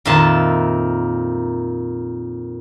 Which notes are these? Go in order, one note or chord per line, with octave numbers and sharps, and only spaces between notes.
F2 A#2 D#3 E5 A5 C6